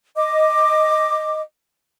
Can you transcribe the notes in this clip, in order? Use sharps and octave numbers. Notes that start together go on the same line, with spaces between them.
D#5 D6